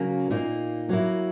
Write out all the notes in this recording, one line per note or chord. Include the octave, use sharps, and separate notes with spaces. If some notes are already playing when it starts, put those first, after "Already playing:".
Already playing: C#3 F#3 A#3
A#2 A#3 D#4
F#3 A#3 E4